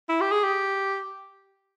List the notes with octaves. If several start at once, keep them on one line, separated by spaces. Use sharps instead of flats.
E4
G4
G#4
G4